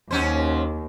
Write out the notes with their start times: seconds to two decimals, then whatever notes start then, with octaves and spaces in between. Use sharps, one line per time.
0.11 D#2 F#3 C#4 C5